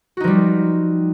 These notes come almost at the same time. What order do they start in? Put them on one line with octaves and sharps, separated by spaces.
F#4 D#4 F3 G3